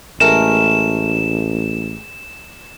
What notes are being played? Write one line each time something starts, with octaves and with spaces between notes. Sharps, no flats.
A1 G#3 A3 A#4 E7